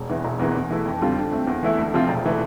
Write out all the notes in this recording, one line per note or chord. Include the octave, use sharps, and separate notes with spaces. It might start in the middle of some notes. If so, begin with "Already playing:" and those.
Already playing: E1
E2 E3
E1
E2 E3 A#3
E2
E3 A3 E4
F2
D3 G3 C4 F4
D3
A3 C4
E2
E3 A3 E4
D2
C3 F3 C4 F4
E1
E3 A3